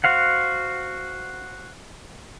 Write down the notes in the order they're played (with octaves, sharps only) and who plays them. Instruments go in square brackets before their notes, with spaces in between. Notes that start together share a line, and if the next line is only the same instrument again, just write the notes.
[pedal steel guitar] F#4 C5 F5 F#5